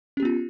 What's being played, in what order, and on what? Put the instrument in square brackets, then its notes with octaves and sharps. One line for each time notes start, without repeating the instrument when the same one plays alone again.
[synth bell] C#4
G4
B3
F4